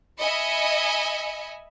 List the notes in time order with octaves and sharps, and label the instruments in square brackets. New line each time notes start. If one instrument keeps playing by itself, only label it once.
[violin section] D#5 E5 G#5 B5 C#7